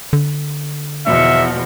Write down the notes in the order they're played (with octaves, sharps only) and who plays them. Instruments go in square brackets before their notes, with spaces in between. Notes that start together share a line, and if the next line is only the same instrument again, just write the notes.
[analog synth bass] D3
[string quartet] E2 B2 F3 [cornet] E5